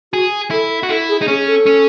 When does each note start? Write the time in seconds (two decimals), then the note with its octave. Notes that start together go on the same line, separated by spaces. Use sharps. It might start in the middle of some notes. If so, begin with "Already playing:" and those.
0.13 F#4 G#4
0.51 E4 A4
0.83 F#4
0.89 E4 A4
1.09 G#4
1.22 D#4
1.28 C#4 G#4
1.47 A4
1.66 C#4